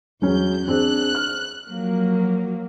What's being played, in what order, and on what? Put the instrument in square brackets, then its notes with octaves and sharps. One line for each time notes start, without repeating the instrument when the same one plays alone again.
[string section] E2 G6 [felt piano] F#3 G#3 C#4
[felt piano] C4 D4 G#4 [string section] F#6
[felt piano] F6
[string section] F3 F#3 A#3